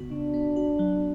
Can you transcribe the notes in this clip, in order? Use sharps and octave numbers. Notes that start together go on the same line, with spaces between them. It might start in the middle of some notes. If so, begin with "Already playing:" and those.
Already playing: C#3 B3 F#4
C#3 D4
B3
F#4
F#3